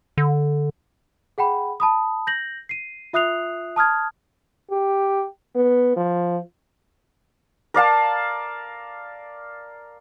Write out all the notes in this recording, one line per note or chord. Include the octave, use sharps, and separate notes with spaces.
D3
G#4 F#5 G5 B5
A5 B5 D#6
G6 A#6 F#7
C7 D#7
F4 E5 D#6 F#6 C7 F7
A5 D#6 F6 G#6
G4
B3
F3
A#4 D5 F5 A5